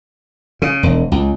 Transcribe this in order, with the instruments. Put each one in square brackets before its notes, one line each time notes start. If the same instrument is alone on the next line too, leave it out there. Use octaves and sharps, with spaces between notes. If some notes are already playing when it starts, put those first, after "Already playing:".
[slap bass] C#3
E1
C#2